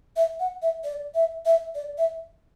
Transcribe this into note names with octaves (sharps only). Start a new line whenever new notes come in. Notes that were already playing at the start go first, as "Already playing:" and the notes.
E5
F#5
E5
D5
E5
E5
D5
E5